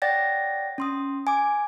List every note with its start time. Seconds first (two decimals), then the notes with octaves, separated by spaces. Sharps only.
0.02 C#5 D5 F#5 G5 A6 A#6
0.78 C#4 C6 D#6
1.27 G#5 D6